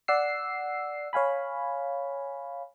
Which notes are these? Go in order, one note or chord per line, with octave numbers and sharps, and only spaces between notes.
D5 F#5 E6 C7
C#5 F5 G#5 B5